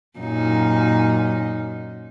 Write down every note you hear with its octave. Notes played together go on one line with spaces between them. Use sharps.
F#2 A#2 D#4